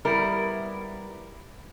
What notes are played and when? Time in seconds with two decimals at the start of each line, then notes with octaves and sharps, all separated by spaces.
0.05 G3 B3 E4 A#4